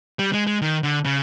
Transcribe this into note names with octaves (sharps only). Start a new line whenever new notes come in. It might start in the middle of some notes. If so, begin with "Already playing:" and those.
G3
G#3
G#3
D#3
D3
C#3